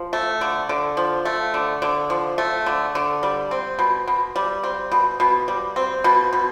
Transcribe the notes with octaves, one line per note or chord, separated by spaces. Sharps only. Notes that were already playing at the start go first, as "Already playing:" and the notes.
Already playing: F3
A3
D3
D3
F3
A3
D3
D3
F3
A3
D3
D3
G3
C4
B2
B2
G3
C4
B2
B2
G3
C4
B2
B2